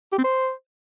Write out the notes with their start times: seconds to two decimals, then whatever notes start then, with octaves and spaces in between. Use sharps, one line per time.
0.12 G4
0.18 C4
0.24 C5